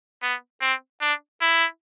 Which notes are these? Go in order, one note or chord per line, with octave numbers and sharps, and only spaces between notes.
B3
C4
D4
E4